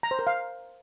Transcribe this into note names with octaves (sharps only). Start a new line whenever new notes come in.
A#5
C5
A#4
F5